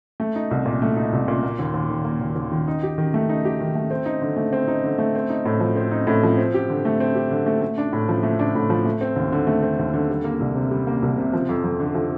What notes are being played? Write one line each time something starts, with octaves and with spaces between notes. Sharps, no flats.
A3
D#4
C2
A#2
A3
D#4
C2
A#2
A#3
D#2
D#2
D#3
A#3
D#2
D#2
D#3
D#4
G4
D#3
A3
D#4
G4
D#3
A3
C4
D#4
D3
A3
C4
D#4
D3
A3
C4
D#4
A2
F3
C4
D#4
A2
F3
C4
G4
D3
A3
C4
G4
D3
A3
A3
D4
A2
F3
A3
D4
A2
F3
A3
C4
D#2
D3
A3
C4
D#2
D3
G3
A#3
C2
C3
G3
A#3
C2
C3
F3
F2
F2
D3
F3